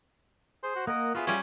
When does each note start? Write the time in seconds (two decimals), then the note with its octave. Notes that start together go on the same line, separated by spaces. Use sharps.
0.64 G#4 C5
0.76 F#4
0.87 A#3 A#4 D#5 F#5
1.15 B3 F4 F#4 G#4 E5
1.27 G3 C#4 F4 G#5